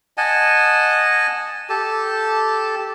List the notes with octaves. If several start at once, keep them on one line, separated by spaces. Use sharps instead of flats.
D#5 F#5 G#5 A5
G4 A4 A5